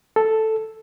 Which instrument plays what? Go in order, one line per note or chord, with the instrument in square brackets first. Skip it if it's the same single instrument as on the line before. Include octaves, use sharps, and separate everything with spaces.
[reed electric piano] A4